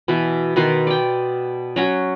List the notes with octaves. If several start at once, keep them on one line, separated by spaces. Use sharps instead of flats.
B2 E3
B2 D#3 B4 C6
D5 G5
F#3 C#4 F#4